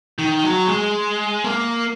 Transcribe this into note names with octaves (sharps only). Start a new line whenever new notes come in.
D#3
F#3
G#3
A#3